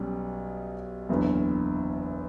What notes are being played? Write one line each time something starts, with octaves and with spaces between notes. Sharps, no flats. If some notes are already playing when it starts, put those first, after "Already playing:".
Already playing: B1 B2 G3 C#4
F#1 E2 D3